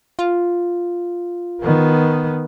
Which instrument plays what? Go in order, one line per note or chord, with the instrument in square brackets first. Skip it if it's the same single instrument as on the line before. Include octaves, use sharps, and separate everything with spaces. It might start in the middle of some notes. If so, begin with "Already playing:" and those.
[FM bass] F4
[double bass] D#3 B3